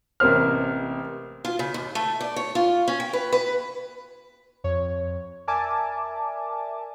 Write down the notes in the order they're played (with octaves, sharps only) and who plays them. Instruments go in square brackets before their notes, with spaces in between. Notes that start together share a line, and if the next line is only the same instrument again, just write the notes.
[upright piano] A1 C3 A#3 C5 F6
[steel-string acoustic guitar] F4
C#3
D#2
A3
D5
C#5
F4
C#4
G5
B4
B4
[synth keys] F2 C#5
A#4 D5 E5 G#5 A5 D6